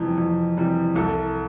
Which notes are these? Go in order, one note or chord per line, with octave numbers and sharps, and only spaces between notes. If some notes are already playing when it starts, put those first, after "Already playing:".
Already playing: F2 C3 E3 G3
F2
C3 E3 G3
C2 A4